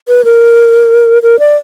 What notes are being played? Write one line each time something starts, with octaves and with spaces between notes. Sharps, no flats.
B4
A#4
A#4
D5